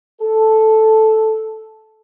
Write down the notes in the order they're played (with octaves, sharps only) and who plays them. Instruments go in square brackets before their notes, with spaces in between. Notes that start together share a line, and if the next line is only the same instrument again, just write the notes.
[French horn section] A4